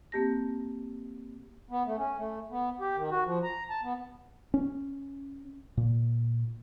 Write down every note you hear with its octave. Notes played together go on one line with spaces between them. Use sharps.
A#3 C4 G4 A5 A#6
B3
A3
C#4
A3
B3
G4
D#3
F#4
F3
A#5
A5
B3
C#4
A#2